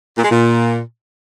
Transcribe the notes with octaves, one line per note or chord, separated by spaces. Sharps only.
A#2
G#3
A#2